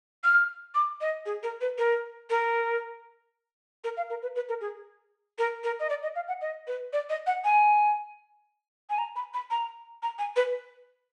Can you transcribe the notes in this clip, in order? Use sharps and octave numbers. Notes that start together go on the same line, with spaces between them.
F6
D6
D#5
G#4
A#4
B4
A#4
A#4
A#4
F5
A#4
B4
B4
A#4
G#4
A#4
A#4
D#5
D5
D#5
F5
F#5
D#5
B4
D5
D#5
F#5
G#5
G#5
A#5
B5
B5
A#5
A#5
G#5
B4